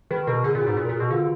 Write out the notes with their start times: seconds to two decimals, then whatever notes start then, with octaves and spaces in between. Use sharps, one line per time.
0.11 D#3 B4
0.27 B2 A#4
0.44 D3 G#4
0.55 A#2
0.61 F#4
0.66 G#2
0.77 A#2
0.85 A#4
0.89 A#2 G#4
1.00 B2 F#4
1.11 D3 F4